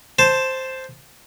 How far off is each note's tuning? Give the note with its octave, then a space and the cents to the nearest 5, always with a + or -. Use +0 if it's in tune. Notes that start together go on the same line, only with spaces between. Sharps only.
C5 +0 A5 +0